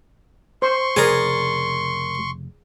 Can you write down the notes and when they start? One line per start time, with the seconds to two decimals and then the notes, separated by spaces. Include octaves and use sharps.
0.62 C5 C6 C#6
0.96 F1 C#3 G#4 A#4 D5 G#5